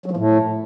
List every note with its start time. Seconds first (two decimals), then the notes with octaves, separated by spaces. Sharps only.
0.06 F#3
0.11 F3
0.17 A2